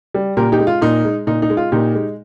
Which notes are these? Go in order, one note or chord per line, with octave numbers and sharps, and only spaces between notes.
G3
A#2 G4 A#4
D#4 G4
G#3
F4
A#2 D#4
G#3
A#2 D#4
D#4
G#3
F4
A#2 D#4 G4
G#3